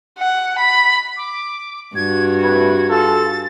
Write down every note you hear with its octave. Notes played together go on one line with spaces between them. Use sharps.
F#5
B5
D6
G2 F#4 G#6
A2 C3 B4 G#6
F4 G#4 A4 A6